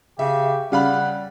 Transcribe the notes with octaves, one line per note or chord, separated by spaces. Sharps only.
C#3 G4 E5
C#3 G3 F5 F#5 B5